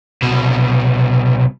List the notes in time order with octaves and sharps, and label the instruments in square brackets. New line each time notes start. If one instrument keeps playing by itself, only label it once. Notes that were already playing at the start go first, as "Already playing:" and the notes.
[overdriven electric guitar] C2 B2